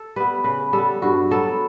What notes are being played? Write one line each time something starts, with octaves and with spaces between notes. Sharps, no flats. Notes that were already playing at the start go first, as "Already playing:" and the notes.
Already playing: A4
G3 B3 B4
C#3 B4
G3 A4
B3
G2 F#4
F#3 B3 A4